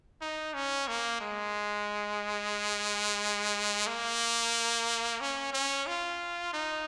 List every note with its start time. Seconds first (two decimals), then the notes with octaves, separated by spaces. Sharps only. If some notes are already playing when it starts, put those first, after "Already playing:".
0.21 D#4
0.54 C#4
0.88 A#3
1.21 G#3
3.87 A#3
5.20 C#4
5.53 C#4
5.87 F4
6.53 D#4